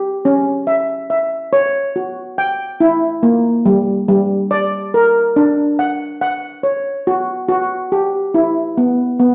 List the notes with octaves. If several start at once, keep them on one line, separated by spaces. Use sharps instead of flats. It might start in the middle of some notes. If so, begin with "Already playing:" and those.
Already playing: G4
C#4
E5
E5
C#5
F#4
G5
E4
A#3
G3
G3
D5
A#4
D4
F#5
F#5
C#5
F#4
F#4
G4
E4
B3
B3